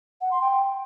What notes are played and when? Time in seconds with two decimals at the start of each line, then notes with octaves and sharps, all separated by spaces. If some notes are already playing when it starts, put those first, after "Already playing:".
0.21 F#5
0.31 C6
0.41 G5